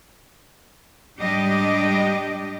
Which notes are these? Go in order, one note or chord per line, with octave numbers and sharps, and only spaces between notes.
G#2 G3 D4 G4 D#5